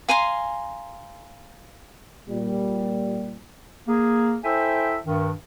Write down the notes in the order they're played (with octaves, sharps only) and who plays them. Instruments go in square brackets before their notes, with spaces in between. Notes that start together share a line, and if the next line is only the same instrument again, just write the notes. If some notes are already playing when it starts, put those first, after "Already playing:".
[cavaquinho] F5 G#5 A#5 C6
[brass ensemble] A#2 G3
[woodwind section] A#3 G#4
E4 A4 C5 E5 G5 G#5
G2 D#3